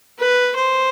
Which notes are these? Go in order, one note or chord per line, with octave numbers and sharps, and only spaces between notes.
B4
C5